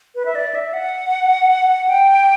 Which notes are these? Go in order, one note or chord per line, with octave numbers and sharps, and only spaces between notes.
B4
E5
D5
E5
F#5
G5